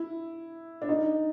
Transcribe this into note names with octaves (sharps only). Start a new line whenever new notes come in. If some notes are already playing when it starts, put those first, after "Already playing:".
Already playing: E4
D4
D#4